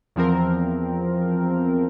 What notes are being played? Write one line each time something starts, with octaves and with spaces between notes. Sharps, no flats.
E2 F3 C4 A#4